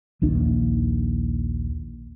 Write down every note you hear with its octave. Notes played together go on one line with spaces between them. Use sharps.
A#1 D#2 D4